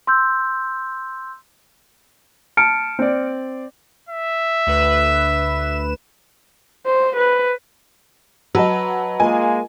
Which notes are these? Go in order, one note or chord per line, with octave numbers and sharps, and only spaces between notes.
C6 E6 G6
A5 F6 C#7 D7
C4 D5
E5
D2 B4 E7
C5
B4
F#3 B4 D#5 A5 E6
G#3 A#3 F4 D#5 G#5